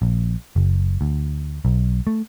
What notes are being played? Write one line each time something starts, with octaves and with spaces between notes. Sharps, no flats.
A#1
F#1
D2
B1
A3